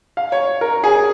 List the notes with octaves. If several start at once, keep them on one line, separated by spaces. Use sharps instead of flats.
F5
C#5
A#4
G#4